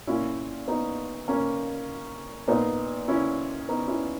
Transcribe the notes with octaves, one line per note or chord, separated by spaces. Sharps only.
A#2 C#4 E4
B3 D#4
A#3 C#4
A#2 B3 D#4
C#4 E4
B3 D#4
C#4 E4